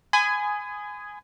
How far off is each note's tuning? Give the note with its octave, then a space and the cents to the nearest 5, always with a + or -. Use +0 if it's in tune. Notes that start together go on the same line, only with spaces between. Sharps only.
G#5 +0 B5 +40 D#6 -10